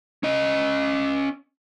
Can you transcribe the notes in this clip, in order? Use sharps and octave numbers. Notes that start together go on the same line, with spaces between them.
C#4 D#5